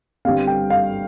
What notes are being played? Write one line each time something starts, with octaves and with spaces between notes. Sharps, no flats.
G1 G2 G3 C4 F5
G5
F5